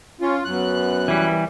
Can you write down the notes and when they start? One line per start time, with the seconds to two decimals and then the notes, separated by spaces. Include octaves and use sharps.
0.21 C#4 F4
0.45 F#2 B3 F#6
1.08 E3 G3